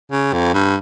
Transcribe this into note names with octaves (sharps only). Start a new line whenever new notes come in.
C#3
F2
G2